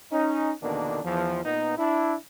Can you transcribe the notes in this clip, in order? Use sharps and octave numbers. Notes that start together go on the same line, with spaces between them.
C#4 D#4
E2 B2 D3 D#3 A#3 D4
E2 F3
A#2 B3 D#4
D4 E4